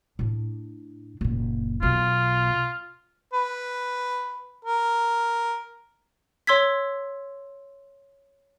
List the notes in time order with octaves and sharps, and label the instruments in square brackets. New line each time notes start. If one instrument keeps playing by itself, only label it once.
[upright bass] A2 D4
F#1 A#2
[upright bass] B1 B2 [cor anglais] F4
[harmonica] B4
A#4
[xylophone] C#5 C6 E6 G#6 B6